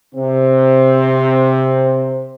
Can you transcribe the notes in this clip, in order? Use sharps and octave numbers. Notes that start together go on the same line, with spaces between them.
C3 C4